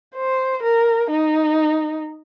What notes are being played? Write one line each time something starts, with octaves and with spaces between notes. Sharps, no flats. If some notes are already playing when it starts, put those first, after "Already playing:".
C5
A#4
D#4